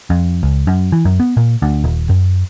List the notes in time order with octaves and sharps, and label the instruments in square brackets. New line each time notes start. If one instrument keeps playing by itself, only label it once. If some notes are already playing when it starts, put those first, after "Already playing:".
[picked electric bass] F2
C#2
F#2
E3
F#2
B3
A#2
D2
D#1
F#2